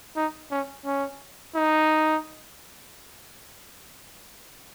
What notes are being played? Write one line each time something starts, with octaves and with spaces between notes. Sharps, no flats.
D#4
C#4
C#4
D#4